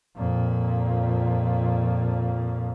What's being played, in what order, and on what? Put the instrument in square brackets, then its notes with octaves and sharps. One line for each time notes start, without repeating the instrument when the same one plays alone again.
[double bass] F2 A#2